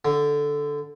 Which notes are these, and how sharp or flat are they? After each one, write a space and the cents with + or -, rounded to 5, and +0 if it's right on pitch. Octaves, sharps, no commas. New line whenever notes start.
D3 -5